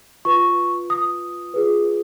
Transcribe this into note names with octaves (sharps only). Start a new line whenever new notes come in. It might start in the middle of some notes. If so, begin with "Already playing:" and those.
F4 B4 C#6
D#6
F4 G#4 B4